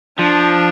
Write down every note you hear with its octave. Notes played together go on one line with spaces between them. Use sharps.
F3 D4